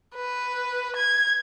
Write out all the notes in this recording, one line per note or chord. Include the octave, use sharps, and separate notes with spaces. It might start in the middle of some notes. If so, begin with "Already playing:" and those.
B4
G#6